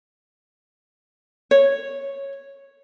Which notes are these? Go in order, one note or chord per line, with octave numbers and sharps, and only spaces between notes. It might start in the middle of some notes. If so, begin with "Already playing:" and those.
C#5